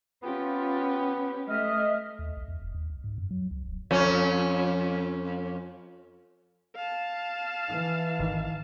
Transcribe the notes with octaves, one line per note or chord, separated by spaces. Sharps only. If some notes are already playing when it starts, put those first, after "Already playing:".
B3 C#4 F4 G4
A3 D#5 E5 F6
D#2
B1
E2
F1
D#2
C#2
G#2
F#2
F#3
C#2
D#1
F2 C#4
F5 A5
E3
G#1 D#3